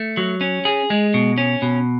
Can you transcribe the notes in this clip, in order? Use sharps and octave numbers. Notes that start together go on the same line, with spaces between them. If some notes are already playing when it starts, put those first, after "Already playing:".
Already playing: A3
F#3
C#4
G#4
G#3
B2
C#4
B2